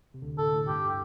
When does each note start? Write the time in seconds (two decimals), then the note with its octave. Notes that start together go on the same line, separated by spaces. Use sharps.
0.14 C3
0.22 D2 D3
0.38 A2 A4
0.54 A2
0.68 G2 G4